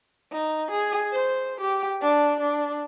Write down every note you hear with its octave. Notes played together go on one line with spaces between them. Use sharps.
D#4
G#4
C5
G4
D4
D4